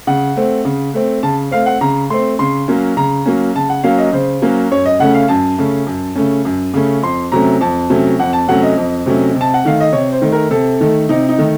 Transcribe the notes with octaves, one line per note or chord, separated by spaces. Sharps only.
C#3 F#5
A3 C4
C#3
A3 C4
C#3 A5
A3 C4 F5
F#5
C#3 A#5
A3 C4 C6
C#3 C6
F#3 A#3 C#4
C#3 A#5
F#3 A#3 C#4
C#3 A5
F#5
F#3 A#3 C#4 F5
D#5
C#3 C5
F#3 A#3 C#4
F#2 C#5
D#5
C#3 A3 C#4 F#5
F5
F#2 A5
C#3 A3 C#4
F#2
C#3 A3 C#4
F#2
C#3 A3 C#4
F2 C6
C3 F#3 A3 C#4 A#5
F2 A5
C3 F#3 A3 C#4
F2 F#5
A5
C3 F#3 A3 C#4 F#5
D#5
F2
C3 F#3 A3 C#4
C3
A5
F#5
D#3 A3 F5
D#5
C3 C#5
C5
D#3 A3
A#4
C3 A4
D#3 A3
C3 D#4
D#4
D#3 A3